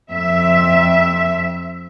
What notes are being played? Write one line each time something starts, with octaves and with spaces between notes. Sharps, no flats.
F2 E5